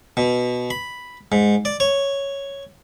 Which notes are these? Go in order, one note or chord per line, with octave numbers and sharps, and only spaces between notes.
B2
B5
G#2
D5
C#5